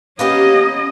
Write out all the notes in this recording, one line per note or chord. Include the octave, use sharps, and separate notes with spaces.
A#3 B3 C#4 G4 D#5